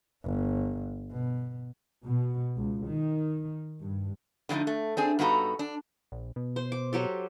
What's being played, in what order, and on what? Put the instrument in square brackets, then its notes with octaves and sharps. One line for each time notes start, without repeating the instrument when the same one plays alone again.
[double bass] G1
B2
[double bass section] B2
C#2
D#3
G2
[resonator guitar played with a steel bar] D3 F3 F#3 A3 D#4
A3
C4 D4 G#4
G2 B3 D#4 F#4 A4 A#5
D4
[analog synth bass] A#1
B2
[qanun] C5
D6
F#3 G4 A4